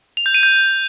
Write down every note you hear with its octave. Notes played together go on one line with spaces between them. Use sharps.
F7
G6
D#7
G6